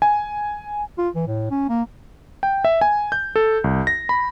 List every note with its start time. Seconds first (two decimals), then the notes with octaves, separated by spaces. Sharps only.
0.02 G#5
0.98 F4
1.16 E3
1.28 A2
1.51 C#4
1.69 A#3
2.43 G5
2.65 E5
2.81 G#5
3.12 G6
3.36 A4
3.64 C2
3.87 A#6
4.09 B5